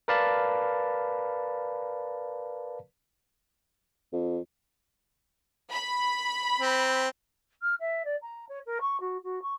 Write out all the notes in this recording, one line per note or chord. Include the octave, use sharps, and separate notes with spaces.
A#4 B4 D5 F5 A5 B5
F2
B5
C4
F6
E5
D5
A#5
C#5
A#4
C#6
F#4
F#4
C#6